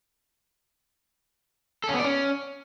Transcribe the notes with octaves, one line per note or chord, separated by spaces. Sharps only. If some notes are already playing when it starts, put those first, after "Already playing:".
A4
C#4
B3
D5
C#4